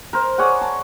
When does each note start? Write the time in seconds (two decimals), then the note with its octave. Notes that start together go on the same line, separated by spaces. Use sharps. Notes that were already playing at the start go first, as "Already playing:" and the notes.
0.13 A#4 C5
0.38 G#4 C#5 D5 F#5
0.61 A5